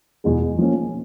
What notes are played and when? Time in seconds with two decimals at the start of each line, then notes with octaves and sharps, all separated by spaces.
0.24 E2 B2 G#3
0.58 F3 A#3 C#4